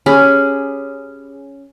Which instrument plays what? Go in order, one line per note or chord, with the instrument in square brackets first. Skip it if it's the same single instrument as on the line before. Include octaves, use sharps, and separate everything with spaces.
[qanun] C#4 G4 G#4 B5